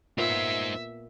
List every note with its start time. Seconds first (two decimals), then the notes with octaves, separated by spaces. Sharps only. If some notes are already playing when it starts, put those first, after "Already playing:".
0.18 A#2 B3 D#4 C5 D5 E5